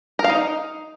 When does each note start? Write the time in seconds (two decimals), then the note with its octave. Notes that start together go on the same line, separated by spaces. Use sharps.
0.19 A#4
0.24 F5
0.30 D#4